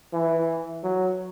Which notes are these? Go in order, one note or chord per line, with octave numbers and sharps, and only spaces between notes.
E3
F#3